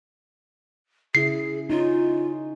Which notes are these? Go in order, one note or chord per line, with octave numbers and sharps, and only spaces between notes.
C#3 E4 G#4 C7
C#4 D#4 F4